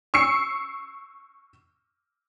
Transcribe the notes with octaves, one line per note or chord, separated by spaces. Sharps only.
C#6 E6 C7 C#7